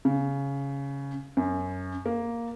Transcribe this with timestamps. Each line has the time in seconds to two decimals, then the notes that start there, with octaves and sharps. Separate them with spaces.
0.05 C#3
1.37 F#2
2.06 A#3